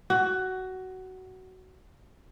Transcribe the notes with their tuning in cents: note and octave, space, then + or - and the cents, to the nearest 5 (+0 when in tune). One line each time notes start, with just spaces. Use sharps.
F#4 +15